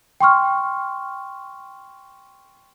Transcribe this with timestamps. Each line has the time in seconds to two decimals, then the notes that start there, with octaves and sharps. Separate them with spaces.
0.20 G5 C6 C#6 F6